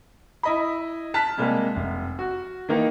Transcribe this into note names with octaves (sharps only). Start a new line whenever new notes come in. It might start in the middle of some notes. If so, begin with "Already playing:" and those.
E4 D#5 B5
A5 F6 F#6 B6
C3 G3 G#3 A#3
F1
F#4
D#3 E3 A#3 D#4